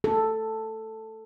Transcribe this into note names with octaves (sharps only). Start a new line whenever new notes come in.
A4